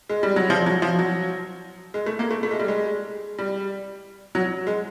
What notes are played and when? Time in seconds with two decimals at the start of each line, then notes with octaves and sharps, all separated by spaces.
0.09 G#3
0.23 G3
0.36 F#3
0.50 F3
0.66 F#3
0.82 F3
0.99 F#3
1.94 G#3
2.06 A3
2.19 A#3
2.31 A3
2.43 A3
2.51 G#3
2.59 G3
2.68 G#3
3.38 G3
4.35 F#3
4.67 G#3